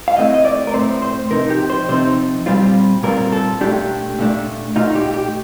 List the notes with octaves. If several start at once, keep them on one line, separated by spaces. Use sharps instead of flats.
F5
A2 A3 C4 D#5
D#5
D5
A#4
A2 A3 C4 C5
C5
C3 F3 C4 D#4 A#4
G4
C5
C3 F3 C4 D#4 C5
A#2 G3 C4 F4
A#2 G3 C4 F4 A#4
A4
A#2 A3 D4 G4
A#2 A3 D4
A#2 A3 D#4 F4
G4
G4